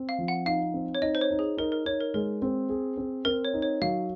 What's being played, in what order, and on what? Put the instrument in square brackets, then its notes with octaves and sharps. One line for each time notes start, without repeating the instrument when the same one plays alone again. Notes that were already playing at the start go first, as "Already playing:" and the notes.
Already playing: [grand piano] C4
[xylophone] F5
[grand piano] F3
[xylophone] F#5
[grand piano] D#4 [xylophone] F5
[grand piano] C4
[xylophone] C#5
[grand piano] D#4 [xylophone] D#5
[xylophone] C5
C#5
[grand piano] D#4
[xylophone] G#4
[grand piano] D#4 [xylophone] A#4
[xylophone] A#4
[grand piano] D#4 [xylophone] C#5
[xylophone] A#4
[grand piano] G#3 [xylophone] A#4
[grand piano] C4
G#4
C4
[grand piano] C4 [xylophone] A#4
[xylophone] C#5
[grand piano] D#4
[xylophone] C#5
[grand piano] F#3 [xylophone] F5